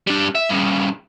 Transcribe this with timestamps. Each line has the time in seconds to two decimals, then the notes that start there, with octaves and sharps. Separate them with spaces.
0.07 G3 D4
0.35 E5
0.50 G2 C#3